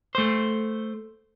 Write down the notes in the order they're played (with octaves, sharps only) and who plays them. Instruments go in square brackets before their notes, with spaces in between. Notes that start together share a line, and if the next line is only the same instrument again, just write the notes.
[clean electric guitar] A3 C5